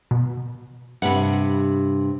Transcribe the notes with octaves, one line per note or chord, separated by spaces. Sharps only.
B2
G2 C3 F#5 B5